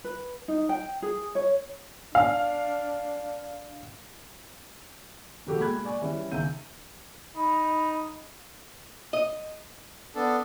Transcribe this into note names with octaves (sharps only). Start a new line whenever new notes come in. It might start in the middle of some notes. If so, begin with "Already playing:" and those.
B4
D#4
G5
G#4
C#5
D4 F5
F1 F#4 G4 A4
G#3 A#3 B5 F#6 G#6
D5 G#5 C#6
E3 G3 C#4
C#2 D#3 E5 G6 D#7
D#4 B5
D#5
B3 D4 A4